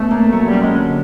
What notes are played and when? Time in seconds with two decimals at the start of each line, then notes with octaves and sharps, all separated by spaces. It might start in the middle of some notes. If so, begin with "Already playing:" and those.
Already playing: B2 A3 C#4
0.11 A#3
0.32 F#3 A3
0.47 G3
0.53 C#4
0.61 G#3
0.75 D3